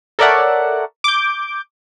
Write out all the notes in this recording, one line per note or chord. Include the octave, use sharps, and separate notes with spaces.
A4 A#4 C#5 D5 E5 F#5
D6 G6